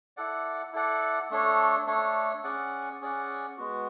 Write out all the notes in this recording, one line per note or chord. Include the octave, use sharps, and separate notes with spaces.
E4 A4 D5 F#5
E4 A4 D5 F#5
A3 D4 A4 C#5
A3 D4 A4 C#5
C#4 G#4 D5 F#5
C#4 G#4 D5 F#5
G#3 B3 F#4